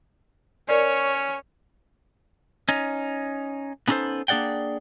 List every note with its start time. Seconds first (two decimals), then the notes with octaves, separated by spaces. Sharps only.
0.69 C#4 A#4 C#5 D5
2.69 C#4 D#4
3.88 B3 C#4 D#4 F#4 A4 C5
4.28 A#3 D4 G#4 D5 F#5 G5